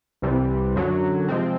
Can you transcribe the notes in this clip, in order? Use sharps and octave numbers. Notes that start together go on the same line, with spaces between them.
C2 C3 E3 G3
F#2 D3 F#3
C3 F3 G#3 C4